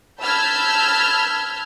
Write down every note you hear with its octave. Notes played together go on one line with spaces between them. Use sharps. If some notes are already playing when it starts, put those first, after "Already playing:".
A5 B5 E6 F6 G6 G#6